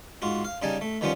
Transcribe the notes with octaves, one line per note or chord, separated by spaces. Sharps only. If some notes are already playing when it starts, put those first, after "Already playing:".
G#2 F4 F#4
F5
C#3 G3 D#4 G#5 A5
A3
D#3 F3 G3 B3 C#4 F4